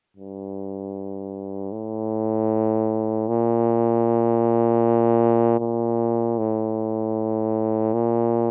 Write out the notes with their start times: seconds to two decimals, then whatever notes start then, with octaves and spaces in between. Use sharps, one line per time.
0.17 G2
1.72 A2
3.28 A#2
5.60 A#2
6.38 A2
7.94 A#2